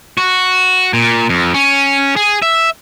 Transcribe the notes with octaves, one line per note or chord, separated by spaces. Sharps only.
F#4
A#2
F2
C#4
G#4
E5